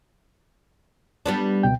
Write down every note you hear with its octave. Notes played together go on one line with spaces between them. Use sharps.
G3 B3 D4
C#2 B2 G5